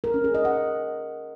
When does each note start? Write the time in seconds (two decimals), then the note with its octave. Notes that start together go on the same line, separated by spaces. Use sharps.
0.04 A#4
0.14 C#4
0.24 G#4
0.35 D#5
0.45 F#5